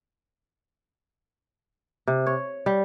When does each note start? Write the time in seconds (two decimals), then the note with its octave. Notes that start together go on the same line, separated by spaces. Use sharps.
2.07 C3
2.26 C#5
2.66 G3